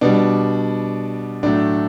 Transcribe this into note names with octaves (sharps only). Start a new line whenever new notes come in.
B2 G3 D4
A2 F#3 A3 D4